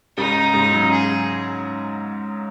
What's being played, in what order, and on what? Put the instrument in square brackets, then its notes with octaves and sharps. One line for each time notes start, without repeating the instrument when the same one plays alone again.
[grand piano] G#2 C#3 [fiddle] D#4
[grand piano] G#2 C#3
C#3 F#3
[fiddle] G#4